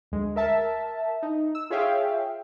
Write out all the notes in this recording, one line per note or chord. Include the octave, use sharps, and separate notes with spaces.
D2 G#3
A#4 E5 A5
D#4
E6
F4 G#4 C#5 E5 F5 G5